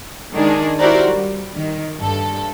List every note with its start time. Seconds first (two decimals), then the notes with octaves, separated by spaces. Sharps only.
0.34 D#3 G#3 D4 G#4
0.79 E4 F#4 G4 A#4 C5 D5
1.08 G3
1.56 D#3
2.00 G2 A4